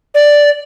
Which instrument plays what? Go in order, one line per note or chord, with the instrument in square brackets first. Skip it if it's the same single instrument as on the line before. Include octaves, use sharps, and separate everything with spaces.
[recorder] D5